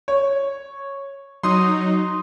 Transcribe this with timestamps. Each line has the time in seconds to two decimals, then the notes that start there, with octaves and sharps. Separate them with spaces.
0.08 C#5
1.43 F#3 D#4 C6 D#6